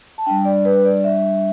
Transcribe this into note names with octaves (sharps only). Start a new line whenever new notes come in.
A5
G3 D4 G5
D5
B4
D5
E5